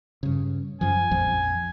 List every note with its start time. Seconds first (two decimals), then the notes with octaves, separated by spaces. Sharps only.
0.23 G2 C#3
0.81 F#2 F3 G#5
1.11 A#1 F2 F3